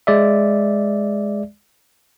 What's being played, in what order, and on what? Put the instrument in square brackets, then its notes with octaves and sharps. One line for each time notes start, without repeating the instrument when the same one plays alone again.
[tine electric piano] G#3 D5 E5